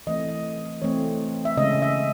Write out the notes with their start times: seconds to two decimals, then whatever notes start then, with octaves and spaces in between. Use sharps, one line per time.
0.07 E3 A3 C4 D#5
0.82 E3 A3 C4 C#5
1.45 E5
1.57 C#3 G#3 C#4 D#5
1.82 E5